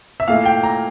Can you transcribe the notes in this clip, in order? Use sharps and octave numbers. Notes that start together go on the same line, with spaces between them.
E5
A#2 A3 E4 F5
G5
A#5